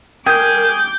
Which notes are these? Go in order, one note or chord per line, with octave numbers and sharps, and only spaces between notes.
G#4 A#4 G5 D6 G6